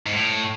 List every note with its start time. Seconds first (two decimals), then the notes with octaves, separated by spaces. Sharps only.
0.06 G#2
0.13 A2